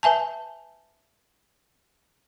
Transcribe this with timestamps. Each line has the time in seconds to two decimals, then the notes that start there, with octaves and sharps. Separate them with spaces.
0.03 B4 E5 G#5 A5